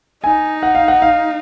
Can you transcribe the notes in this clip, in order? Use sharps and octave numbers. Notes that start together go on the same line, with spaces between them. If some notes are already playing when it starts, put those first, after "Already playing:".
D#4 G#5
F#5
F5
F#5
F5